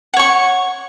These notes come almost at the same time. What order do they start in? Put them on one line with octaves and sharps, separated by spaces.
F#5 C#5 C#6